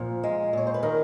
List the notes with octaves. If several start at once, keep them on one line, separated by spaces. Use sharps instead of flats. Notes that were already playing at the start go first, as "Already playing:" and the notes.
Already playing: A#2 F3
G#3
A#2 C#5
C5
B4
D#3 A#4